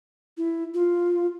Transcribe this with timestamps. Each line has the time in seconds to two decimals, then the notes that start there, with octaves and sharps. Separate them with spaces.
0.37 E4
0.74 F4